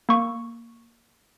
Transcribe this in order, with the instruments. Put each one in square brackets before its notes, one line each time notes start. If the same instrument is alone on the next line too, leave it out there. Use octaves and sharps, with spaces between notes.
[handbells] A#3 C#6